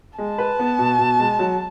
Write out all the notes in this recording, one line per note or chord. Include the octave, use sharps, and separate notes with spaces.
G#3 A5
B4
B3
B2
B2
G#3
F#3